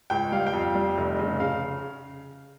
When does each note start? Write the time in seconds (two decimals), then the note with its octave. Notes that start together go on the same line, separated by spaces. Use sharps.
0.10 C#2 G5
0.32 G3 F5
0.47 G5
0.53 F2
0.61 F5
0.75 G3
0.98 F1
1.19 C#3
1.40 C#3 F5